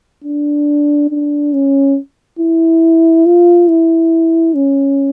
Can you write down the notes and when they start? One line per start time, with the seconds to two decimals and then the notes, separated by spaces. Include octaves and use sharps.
0.24 D4
1.10 D4
1.53 C#4
2.39 E4
3.25 F4
3.68 E4
4.55 C#4